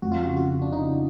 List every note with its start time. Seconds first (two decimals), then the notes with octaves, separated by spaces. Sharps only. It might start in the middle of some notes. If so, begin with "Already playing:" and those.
0.02 F2 F#4
0.12 F4
0.23 C#3 F#4
0.37 F#4
0.48 C#3
0.62 D4
0.71 C#3 D#4